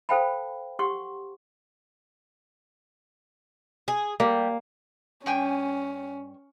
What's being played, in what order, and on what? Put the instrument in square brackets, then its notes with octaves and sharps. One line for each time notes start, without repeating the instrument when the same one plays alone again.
[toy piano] A4 C5 F5 G5 A5 B5
G4 F#5 C6 C#6
[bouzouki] G#4
[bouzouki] G3 [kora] A#3
[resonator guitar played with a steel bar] G2 G5 G#5 [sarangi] C#4